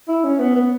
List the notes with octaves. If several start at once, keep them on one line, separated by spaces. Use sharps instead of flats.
E4
C#4
B3
B3